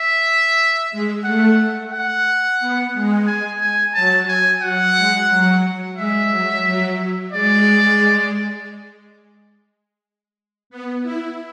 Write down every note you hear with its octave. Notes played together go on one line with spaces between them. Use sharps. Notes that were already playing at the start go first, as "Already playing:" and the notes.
Already playing: E5
G#3
A3 F#5
F#5
B3
G#3
G#5
G#5
F#3 A5
G#5
F#3 F#5
G#3
F#3
G#3 E5
F#3
F#3
G#3 D5
B3
E4